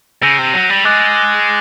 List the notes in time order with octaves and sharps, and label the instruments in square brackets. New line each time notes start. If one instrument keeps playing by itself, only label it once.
[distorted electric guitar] C#3 [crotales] E6 G6 A#6 D#7
[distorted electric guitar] C3
F#3
G3
[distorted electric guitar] G#3 [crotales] D6 F#6 A6